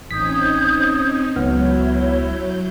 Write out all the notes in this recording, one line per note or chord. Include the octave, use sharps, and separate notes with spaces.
A1 C4 C#4 D#4 D#6 G6 G#6 B6
C#2 F#3 B3 E4 C#5 F6 G6